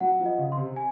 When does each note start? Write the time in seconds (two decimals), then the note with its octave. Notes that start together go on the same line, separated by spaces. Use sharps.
0.01 F#3 F#5
0.19 F3
0.26 D#5
0.38 C#3
0.52 C6
0.57 C3
0.76 G#5